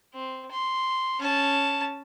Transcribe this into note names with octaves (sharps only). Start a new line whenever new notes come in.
C4
C6
C#4 A5